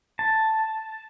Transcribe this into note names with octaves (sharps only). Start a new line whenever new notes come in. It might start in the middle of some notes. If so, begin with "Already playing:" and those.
A5